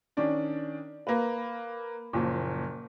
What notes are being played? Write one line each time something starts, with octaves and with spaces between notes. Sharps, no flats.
D#3 C#4 D4 D5
A#3 A#4 B4
F#1 A#2 F3